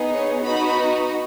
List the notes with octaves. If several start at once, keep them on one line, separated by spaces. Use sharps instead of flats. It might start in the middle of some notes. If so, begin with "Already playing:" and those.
Already playing: B3 D#4 G#4
C#5
B3 D#4 F#4 B5